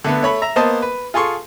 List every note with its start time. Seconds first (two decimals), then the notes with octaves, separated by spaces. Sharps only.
0.04 D3 A3 B3
0.23 A3 C#5 B5
0.42 E5 A#5
0.56 A#3 B3 C5 D#5 A5
0.82 B4
1.14 F4 G#4 A4 C6 C#6